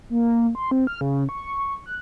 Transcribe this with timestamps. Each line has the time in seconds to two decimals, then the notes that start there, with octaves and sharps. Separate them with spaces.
0.10 A#3
0.55 C6
0.71 C4
0.87 F6
1.01 C#3
1.29 C#6
1.86 F#6